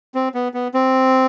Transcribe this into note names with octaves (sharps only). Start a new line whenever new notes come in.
C4
B3
B3
C4